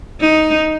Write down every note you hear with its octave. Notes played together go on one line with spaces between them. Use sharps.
D#4